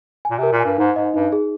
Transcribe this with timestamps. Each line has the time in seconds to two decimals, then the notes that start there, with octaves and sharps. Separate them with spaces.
0.25 G#5
0.31 A#2
0.38 C3
0.43 A#4
0.52 A#2
0.60 G2 G#5
0.78 G#2 D#4
0.96 G#2 D#5
1.14 G2 D#4
1.32 G#4